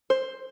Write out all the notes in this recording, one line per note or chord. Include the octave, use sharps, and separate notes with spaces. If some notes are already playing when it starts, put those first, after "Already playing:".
C5